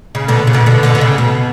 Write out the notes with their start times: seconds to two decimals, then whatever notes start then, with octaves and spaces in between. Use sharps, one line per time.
0.15 C#3
0.28 B2 D3
0.47 C#3
0.53 B2 D3
0.66 B2 D3
0.83 B2 D3
0.95 B2
1.01 C#3
1.18 B2